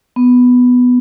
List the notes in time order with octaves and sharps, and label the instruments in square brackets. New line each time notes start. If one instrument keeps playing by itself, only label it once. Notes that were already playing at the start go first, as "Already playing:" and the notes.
[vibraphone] B3